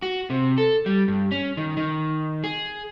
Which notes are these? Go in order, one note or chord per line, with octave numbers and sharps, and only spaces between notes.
F#4
C3
A4
G3
G2
C#4
D#3
D#3
G#4